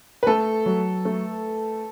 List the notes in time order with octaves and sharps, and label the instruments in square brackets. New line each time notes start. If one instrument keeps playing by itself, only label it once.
[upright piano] B4
[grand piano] A3 [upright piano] A4
[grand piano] F#3
A3